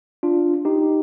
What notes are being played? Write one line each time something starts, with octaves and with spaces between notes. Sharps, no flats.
D4 F4
D#4 G4